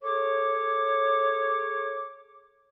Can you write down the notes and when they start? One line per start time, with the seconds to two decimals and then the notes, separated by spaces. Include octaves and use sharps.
0.03 G#4 A4 C#5 D6